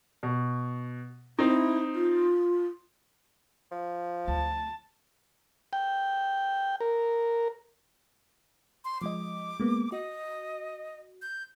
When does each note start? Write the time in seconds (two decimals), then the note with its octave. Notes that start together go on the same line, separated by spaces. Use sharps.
0.23 B2
1.39 C4 D#4 E4
1.93 F4
3.72 F3
4.28 D2 A5
5.73 G5
6.81 A#4
8.85 C6
9.01 F3 G#3 D#5 D6
9.60 G#3 A#3 B3
9.92 F#4 D#5
11.22 G6